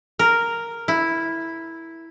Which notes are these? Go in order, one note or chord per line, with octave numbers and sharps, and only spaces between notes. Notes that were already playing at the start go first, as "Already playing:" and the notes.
A#4
E4